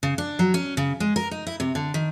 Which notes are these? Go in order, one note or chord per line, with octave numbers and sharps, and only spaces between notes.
C#3
D4
F#3
C#4
C#3
G#3
A#4
D#4
E4
C3
D3
D#3